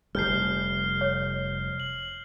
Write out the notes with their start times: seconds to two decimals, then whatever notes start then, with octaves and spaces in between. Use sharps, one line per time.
0.15 F1 G3 F6 G6 C7
1.01 C#5
1.80 F#7